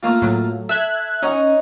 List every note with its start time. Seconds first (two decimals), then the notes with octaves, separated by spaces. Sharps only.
0.03 A3 A#3 F4
0.22 A2 F#3
0.69 A4 E5 F#6 G#6
1.23 C#4 D#4 C#5 F#5